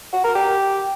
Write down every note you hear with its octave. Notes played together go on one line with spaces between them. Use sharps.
F#4
A#4
G4